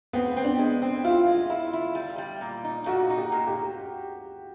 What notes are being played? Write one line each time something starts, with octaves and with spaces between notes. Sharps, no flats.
B3 C4
C4
D4
G#3
C4
E4 F4
G#3
E4
E4
G3
G3
A#2
D#4
A#2 F#4
D#4
G4
A#2
G4